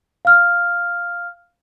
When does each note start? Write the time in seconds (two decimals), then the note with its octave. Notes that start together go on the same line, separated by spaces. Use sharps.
0.25 F5 F6